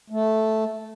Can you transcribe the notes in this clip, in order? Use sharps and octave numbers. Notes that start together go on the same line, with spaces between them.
A3